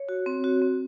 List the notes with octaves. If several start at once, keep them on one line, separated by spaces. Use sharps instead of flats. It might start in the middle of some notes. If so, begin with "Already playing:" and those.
Already playing: C#5
F#4
C4
F#4
C4